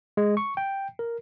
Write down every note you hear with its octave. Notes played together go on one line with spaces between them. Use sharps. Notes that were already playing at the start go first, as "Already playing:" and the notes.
G#3
C#6
G5
A#4